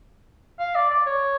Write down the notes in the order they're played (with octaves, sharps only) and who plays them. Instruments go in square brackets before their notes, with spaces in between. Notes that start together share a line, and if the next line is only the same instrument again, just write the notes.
[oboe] F5
D5
D5
C#5